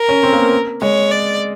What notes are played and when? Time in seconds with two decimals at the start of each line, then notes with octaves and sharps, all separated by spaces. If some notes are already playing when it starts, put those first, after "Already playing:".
Already playing: A#4
0.09 C#4
0.23 C4
0.33 A#3
0.37 B3
0.82 G#3 C#5
1.11 D5